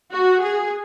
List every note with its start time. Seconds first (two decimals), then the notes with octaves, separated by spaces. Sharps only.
0.13 F#4
0.42 G#4